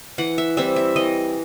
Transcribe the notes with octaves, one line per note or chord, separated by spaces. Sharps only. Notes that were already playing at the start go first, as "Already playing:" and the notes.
E3 F#5
E5
G3 C4 E4 E5
E5
E3 D#5